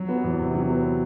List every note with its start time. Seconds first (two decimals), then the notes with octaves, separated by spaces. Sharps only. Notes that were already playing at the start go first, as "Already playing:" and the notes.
Already playing: F#3
0.09 B3
0.24 E2
0.39 C3
0.54 F#3
0.70 B3